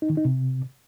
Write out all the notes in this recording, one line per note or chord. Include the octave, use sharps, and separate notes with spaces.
D#4
D#3
D#4
C3